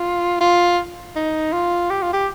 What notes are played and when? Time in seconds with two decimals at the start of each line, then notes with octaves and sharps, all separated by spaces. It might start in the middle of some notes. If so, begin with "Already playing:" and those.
Already playing: F4
0.41 F4
1.16 D#4
1.53 F4
1.90 G4
2.02 F4
2.13 G4